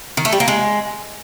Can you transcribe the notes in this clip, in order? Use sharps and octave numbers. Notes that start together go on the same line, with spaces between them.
D#3
A3
G3
A#3
G#3